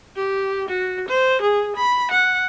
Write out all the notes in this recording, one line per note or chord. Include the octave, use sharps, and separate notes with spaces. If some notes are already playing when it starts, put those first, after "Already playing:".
G4
F#4
C5
G#4
B5
F#5